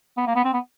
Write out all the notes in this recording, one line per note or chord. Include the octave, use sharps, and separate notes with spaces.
B3
A#3
B3
C4
B3